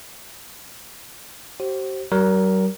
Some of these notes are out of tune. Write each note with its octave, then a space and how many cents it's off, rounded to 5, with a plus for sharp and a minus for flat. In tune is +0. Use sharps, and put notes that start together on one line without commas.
G4 -45 C5 +20
F#3 +45 A#4 +10